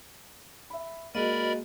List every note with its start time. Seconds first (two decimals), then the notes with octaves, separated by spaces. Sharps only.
0.70 E5 B5
1.15 G#3 A#3 F#4 A#4 D5 D#5 B5